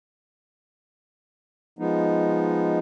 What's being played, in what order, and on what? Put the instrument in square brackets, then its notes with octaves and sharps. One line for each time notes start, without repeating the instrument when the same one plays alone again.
[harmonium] F3 G#3 B3 D#4